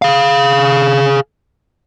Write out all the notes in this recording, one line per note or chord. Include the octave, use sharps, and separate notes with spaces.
G#4 F5